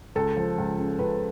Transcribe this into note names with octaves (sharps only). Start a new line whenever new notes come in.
C#2 A4
F3
C#2
C#3
C#2 B4